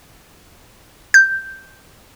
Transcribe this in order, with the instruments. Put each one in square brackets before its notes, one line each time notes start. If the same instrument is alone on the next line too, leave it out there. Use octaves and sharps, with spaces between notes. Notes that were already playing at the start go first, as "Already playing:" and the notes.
[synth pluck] G6